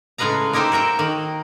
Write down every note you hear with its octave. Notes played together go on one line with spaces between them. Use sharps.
A2 C#3 G#3 B4 F5 A#5
A#3 D#4 G4 C5 E5
F#4 A#4 E5 G5
D#3 A#3